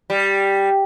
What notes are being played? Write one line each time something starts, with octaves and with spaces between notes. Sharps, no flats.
G3